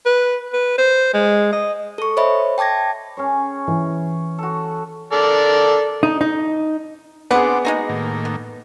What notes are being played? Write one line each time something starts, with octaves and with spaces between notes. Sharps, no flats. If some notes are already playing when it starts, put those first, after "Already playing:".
B4
B4
C5
G#3
D#5
A4 C#6
C5 C#5 D#5 E5 B5
G5 A5 D6 G#6 A#6
C#4 G#4 C#5
E3
F#4 A4
A4 A#4 D5
D#4
D#4
B3 C4 D4 G#4 B4 F#5 D6
G#3 A#3 D#4 F#4
A2 D#3 A#3
B3